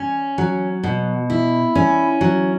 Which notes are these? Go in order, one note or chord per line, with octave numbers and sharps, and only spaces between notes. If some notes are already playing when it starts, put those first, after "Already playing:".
Already playing: C#4
F#3
B2
E4
C#4
F#3